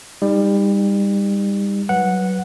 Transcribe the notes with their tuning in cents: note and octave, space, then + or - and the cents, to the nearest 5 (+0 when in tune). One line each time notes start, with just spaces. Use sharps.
G3 +30 D#4 +0
F#3 +15 B4 +0 F#5 -10